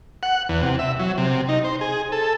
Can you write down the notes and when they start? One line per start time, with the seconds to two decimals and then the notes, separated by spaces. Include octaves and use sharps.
0.23 F#5
0.49 E2
0.62 C3
0.79 E5
0.99 F#3
1.18 C3
1.49 D#4
1.64 C5
1.81 G#4
2.12 A4